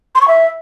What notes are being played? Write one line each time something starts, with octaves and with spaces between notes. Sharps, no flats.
C6
C#6
E5